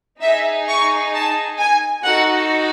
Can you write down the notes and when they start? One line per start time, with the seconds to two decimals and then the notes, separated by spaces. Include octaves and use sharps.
0.22 D#4 G#4 E5
0.68 C#6
1.14 A5
1.59 G#5
2.04 D#4 F#4 A4 F#5